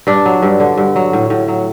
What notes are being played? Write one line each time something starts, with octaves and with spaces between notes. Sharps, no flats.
G2 D4
F#3
G2
D3
G2
F#3
A2
A2
F#3